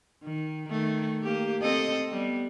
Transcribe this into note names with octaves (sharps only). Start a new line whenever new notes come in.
D#3
D#3 A3
A#3 G4
C4 A4 D#5
G3 B3